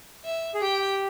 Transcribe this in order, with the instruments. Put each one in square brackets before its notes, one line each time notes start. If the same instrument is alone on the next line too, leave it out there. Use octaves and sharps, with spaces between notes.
[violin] E5
[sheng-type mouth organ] G#4
[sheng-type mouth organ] G4 [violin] G5